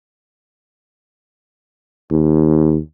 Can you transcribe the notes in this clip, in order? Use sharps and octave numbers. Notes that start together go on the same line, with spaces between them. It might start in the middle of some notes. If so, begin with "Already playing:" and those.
D#2